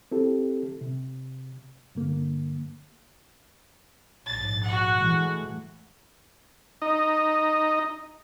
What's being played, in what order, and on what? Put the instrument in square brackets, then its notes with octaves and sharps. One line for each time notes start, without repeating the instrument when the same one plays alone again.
[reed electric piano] C4 E4 G4 A4
C3
G2 D3 A#3
[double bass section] A#1 G#2 [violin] A6
[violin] F#4 F#5
[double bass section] E3 G#3 A3
[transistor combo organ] D#4 D#5